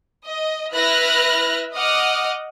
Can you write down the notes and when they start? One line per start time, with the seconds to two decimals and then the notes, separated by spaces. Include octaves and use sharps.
0.23 D#5
0.73 E4 B4 E5 F6 F#6 A#6
1.76 D#5 F#5 D6 D#6 F6